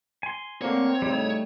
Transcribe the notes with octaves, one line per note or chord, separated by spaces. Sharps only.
G#5 C6
D3 A3 A#3 C4 C#5
A2 C#3 G3 A3 D#4